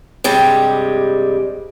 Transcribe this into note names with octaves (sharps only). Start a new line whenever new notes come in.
G2 C3 G3 G#3